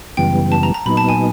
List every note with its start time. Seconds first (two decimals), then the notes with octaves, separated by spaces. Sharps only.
0.17 F#2 C#3 E3 G3 B3 G5
0.52 A5
0.63 A#5
0.74 A#5
0.86 A#2 F#3 B3 D#4 B5
0.97 A5
1.09 G#5